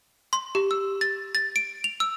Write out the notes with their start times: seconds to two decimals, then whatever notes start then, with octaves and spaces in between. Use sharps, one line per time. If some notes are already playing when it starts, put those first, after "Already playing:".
0.33 C6
0.55 G4
0.71 E6
1.01 A6
1.35 A6
1.56 D7
1.84 F7
2.00 E6